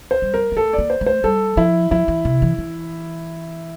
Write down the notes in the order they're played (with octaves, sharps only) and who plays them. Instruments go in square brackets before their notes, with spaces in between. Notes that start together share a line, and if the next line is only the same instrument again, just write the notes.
[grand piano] C5
[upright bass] G3
[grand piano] A#4
[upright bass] A#3
[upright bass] A3 [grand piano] A4
[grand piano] D5
[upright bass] A#3
[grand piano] C5
[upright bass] A3
[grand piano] C5
[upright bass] G3 [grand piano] A4
[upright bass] F3 [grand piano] E4
[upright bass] F3 [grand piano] E4
[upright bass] E3
C3
E3
E3